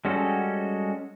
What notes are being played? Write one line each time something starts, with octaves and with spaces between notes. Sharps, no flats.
G3 G#3 C#4 F#4 A4